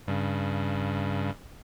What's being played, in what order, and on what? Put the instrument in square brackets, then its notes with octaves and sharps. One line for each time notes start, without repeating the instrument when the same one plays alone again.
[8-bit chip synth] G2 C#3